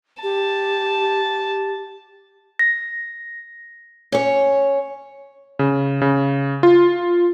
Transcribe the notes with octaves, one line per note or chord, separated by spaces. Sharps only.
G4 A5
A#6
C#4 C#5
C#3
C#3
F4